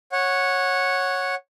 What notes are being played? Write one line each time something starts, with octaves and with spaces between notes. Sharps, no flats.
C#5 F#5